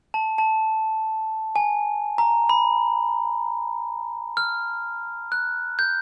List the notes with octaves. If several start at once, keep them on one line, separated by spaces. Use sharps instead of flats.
A5
A5
G#5
A#5
B5
F6
F#6
G6